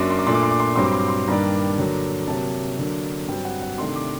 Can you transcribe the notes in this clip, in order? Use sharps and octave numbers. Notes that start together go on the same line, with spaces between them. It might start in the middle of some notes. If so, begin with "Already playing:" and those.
Already playing: F#2 F#3 A#3 D4 C6 D6
C6
D6
A#2 A3 D4 C6
D6
C6
D6
C6
D6
G2 F#3 C4 C6
D6
C6
D6
C6
G2 D#3 G3 A#3 D4 A#5
D3 F#3 A#3 D4
C3 F#3 A#3 A5
D3 F#3 A#3 D4
G2 F#3 C4 G5
F#5
F#5
C3 D#3 A3 D4 C6
D6